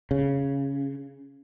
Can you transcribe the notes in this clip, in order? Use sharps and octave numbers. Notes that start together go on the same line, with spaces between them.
C#3